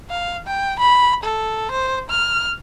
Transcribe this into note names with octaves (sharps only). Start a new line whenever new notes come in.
F5
G5
B5
A4
C5
F6